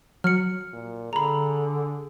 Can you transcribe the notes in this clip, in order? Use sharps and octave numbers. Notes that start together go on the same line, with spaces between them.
F#3 F6 C#7
A#2
D3 G#4 A#5 B5